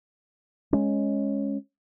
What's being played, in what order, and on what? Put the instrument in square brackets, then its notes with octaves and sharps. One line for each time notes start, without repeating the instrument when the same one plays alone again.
[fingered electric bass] G#3 C#4